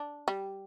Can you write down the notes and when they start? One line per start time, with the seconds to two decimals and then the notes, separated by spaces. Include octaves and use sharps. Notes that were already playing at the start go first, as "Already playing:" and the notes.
Already playing: D4
0.28 G3